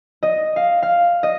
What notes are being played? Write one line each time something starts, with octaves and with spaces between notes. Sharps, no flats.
D#5
F5
F5
D#5